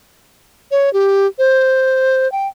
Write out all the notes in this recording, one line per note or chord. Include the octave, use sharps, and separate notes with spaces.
C#5
G4
C5
G5